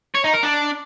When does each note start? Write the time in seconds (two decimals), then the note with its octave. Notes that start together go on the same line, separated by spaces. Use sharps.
0.15 C#5
0.24 D#4
0.34 A#4
0.43 D4